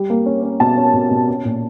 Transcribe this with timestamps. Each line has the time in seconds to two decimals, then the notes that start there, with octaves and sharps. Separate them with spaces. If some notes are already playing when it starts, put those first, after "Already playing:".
Already playing: G3
0.10 A#3
0.26 C#4
0.43 C#4
0.60 B2 A5
0.77 C#4
0.94 B2
1.11 B2
1.28 C#4
1.45 A#2